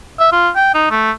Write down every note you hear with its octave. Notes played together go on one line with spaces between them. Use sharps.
E5
F4
G5
D#4
A3